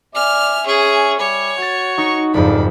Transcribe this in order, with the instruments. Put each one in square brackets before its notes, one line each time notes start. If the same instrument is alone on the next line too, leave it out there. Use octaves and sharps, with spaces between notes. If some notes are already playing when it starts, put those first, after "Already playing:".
[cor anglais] D5 [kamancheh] E5 G#5 [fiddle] F6
[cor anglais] C#4 [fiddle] G#4
[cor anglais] G3 [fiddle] C#5
[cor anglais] F#4 [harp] G#6 A6
[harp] D#4 [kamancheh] C#6
[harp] F#1 F2 G#2 [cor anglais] D4 [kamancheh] B5